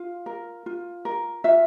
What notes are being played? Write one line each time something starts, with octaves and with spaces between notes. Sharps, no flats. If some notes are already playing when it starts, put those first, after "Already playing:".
Already playing: F4 F5
A#4
F4
A#4
F4 E5